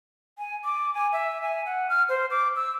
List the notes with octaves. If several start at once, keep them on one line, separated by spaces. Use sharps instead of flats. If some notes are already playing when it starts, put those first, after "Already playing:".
G#5
D6
G#5
E5
G#5
F#5
F6
C5
D6
E6